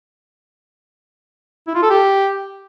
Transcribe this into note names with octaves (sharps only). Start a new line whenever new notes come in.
E4
F4
A4
G4